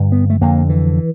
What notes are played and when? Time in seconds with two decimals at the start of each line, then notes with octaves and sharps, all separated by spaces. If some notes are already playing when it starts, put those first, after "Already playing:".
Already playing: G2 D3
0.12 B3
0.30 A3
0.41 F2 D3 A#3
0.69 E3